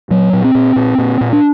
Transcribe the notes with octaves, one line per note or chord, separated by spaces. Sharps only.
A#2 F#3
A#2
C4
A#2
A#2
A#2
A#2
D4